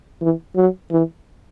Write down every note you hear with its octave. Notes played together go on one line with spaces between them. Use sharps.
E3
F#3
E3